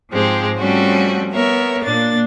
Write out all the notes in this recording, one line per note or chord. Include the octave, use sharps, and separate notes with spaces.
G#2 F3 G#3 C4 G4
F3 G3 A3 C4 C#4 F#4
B3 A#4 C#5 E5
A#2 A#3 D4 A6